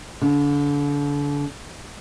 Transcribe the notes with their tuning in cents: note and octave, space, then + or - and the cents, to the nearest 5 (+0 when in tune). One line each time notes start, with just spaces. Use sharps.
D3 -35